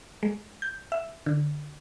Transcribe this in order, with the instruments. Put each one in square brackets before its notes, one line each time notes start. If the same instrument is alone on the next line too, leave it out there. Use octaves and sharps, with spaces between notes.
[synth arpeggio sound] G#3
G6
E5
D3